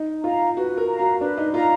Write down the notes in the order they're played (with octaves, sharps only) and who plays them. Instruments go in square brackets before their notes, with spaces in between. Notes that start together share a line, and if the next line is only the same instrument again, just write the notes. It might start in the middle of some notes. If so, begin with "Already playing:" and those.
Already playing: [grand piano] D#4
[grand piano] F4 [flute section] F5 A#5
[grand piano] F#4 [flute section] B4
[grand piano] A#4
[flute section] F5 A#5
[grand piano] F#4
[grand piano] D4 [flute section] B4
[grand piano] D#4
[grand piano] F4 [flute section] F5 A#5